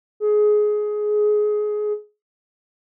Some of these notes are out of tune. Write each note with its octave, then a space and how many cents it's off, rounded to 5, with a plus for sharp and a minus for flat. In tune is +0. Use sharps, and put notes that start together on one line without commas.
G#4 +20